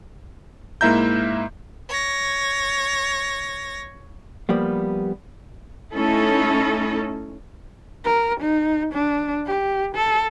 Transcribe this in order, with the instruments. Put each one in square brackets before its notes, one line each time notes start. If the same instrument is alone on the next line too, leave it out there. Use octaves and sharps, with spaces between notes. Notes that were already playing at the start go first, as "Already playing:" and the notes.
[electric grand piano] G#2 A#3 E4 E5 A#5 G6
[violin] C#5 A#6
[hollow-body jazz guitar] F3 G3 A#3 B3
[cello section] A3 C#4 D#4 E4 A4
[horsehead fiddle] A#4
D#4
D4
G4
A4